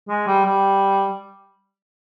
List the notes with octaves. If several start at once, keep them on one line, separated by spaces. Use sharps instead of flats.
G#3
G3
G3